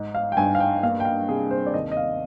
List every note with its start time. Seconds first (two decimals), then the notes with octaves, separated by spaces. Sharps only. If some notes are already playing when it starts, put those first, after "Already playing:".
Already playing: G#2 D#4
0.15 F5
0.32 G5
0.37 G2 G#5
0.55 F5
0.60 G5
0.83 A#3 F5
1.00 G5
1.05 F5
1.29 C3 G#4
1.51 C5
1.67 D5
1.74 D#2 D#5
1.91 D#5
1.97 F5